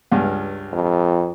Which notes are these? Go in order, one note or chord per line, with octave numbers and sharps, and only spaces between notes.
C#2 G2
F2